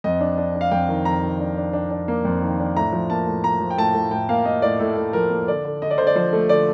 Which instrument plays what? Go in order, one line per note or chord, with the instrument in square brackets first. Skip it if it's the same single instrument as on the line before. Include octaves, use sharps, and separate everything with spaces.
[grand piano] F2 D#5
D4
D4
D4
F5
F2 G5
D#3
F2 A#5
D#3
D4
D4
D4
D4
A#3
F2
D#3
D4
A2 A#5
F3
A#3 A5
A2
A#3 A#5
F3
G5
A2 A5
A2
A2 G5
A#3 F5
A#3 D#5
A2 D5
A2 A4
A2
F3 A#4
A#3
D3 D5
D3
D3 D#5
D5
D3 C5
D5
F3 C5
A3
D3 D5